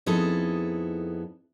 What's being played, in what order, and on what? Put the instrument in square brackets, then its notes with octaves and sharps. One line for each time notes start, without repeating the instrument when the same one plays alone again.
[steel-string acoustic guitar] F2 B3 D#4 E4 G#4 A4